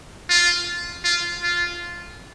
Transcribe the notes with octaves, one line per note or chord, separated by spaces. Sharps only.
F4
F4
F4